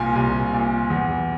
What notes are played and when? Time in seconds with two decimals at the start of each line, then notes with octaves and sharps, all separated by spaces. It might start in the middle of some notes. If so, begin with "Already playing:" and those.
Already playing: C2 A#2 G#5
0.16 C2
0.53 A#2
0.90 E2